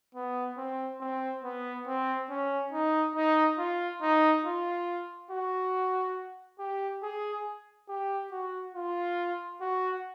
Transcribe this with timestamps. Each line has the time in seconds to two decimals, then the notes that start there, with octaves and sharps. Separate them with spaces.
0.15 B3
0.58 C4
1.00 C4
1.44 B3
1.87 C4
2.30 C#4
2.73 D#4
3.16 D#4
3.59 F4
4.02 D#4
4.45 F4
5.31 F#4
6.59 G4
7.03 G#4
7.89 G4
8.32 F#4
8.75 F4
9.61 F#4